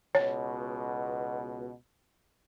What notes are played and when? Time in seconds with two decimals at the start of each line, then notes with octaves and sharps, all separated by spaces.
0.15 C#2 B2 C#5